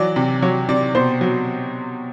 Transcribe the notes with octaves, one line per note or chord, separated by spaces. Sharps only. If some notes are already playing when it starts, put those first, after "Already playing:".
Already playing: E3 F#3 D5
C3
F#3 C#5
C3 D5
B2 C5
F#3